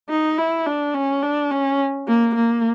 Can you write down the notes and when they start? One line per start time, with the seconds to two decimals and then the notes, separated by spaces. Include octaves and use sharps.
0.10 D#4
0.38 E4
0.67 D4
0.94 C#4
1.23 D4
1.51 C#4
2.08 A#3
2.36 A#3